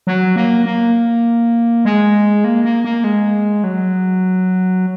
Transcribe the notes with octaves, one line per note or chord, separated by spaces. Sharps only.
F#3
A#3
A#3
G#3
A#3
A#3
A#3
G#3
F#3